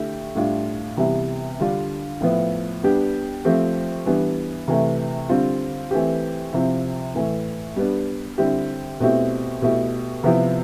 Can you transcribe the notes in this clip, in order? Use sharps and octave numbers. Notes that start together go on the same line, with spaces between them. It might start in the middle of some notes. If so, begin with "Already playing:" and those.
Already playing: D3 A3 E4 G4
A2 G3 D4 F4
C3 E3 G3 B3 E4
D3 G3 D4 F4
A2 F3 B3 E4
G3 B3 D4 G4
F3 A3 C4 G4
E3 G3 B3 D4
C3 E3 A3
D3 G3 C4 F4
E3 A3 C4 G4
C3 F3 C4 E4
A2 E3 A3
G3 B3 D4
D3 G3 C4 E4 G4
B2 A3 C4 E4 G4
B2 A3 E4 G4
C3 F3 B3 E4 G4